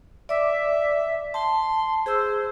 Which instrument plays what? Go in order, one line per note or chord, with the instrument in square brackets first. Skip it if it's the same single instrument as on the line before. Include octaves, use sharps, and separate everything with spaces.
[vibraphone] D5 D6 [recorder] E5
[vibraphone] A5 [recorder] C6
[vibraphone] G#4 E6 [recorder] C5